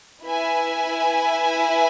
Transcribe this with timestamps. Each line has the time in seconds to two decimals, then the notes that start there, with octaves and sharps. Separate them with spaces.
0.24 E4 B4 E5 G#5